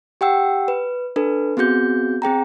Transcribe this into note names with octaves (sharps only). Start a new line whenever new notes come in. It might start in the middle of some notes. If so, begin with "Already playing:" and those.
G4 F#5 G5 E6
B4
D4 A4 B4
B3 C4 F#4 G#4 G6
C4 G#4 G5 A#5